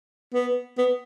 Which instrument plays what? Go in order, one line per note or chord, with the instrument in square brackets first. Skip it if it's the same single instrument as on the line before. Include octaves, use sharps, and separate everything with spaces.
[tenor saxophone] B3
B3